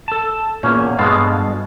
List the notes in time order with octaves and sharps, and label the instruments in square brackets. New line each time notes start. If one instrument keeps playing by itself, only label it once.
[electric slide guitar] A4 A5
[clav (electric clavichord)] E2 C#4 [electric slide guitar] A#2 A#3
[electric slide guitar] G2 A4 F5 [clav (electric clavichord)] B2 G#3 B3